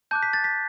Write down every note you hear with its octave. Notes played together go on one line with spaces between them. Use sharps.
A5 D6 F#6 G6
B6
A6
B6